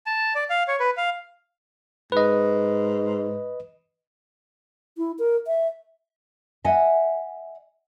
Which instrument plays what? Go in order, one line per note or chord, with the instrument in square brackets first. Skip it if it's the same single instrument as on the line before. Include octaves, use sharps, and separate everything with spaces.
[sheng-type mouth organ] A5
D5
F5
C#5
B4
F5
[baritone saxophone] G#2 [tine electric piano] B4 D#5
[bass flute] E4
A#4
E5
[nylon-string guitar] D#5 E5 F#5 G#5